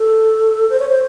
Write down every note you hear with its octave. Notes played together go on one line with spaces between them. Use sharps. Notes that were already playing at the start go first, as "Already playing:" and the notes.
Already playing: A4
C5
C#5
C5